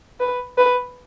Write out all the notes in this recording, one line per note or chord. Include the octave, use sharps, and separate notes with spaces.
B4
B4